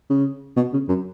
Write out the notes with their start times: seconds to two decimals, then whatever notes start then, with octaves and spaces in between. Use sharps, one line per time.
0.10 C#3
0.56 B2
0.73 C#3
0.88 F#2